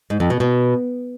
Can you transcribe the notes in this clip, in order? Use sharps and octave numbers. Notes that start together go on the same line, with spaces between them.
G#2
F2
B2
B2